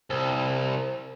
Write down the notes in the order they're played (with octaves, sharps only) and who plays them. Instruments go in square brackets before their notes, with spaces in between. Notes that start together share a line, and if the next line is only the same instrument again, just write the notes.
[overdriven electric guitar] C2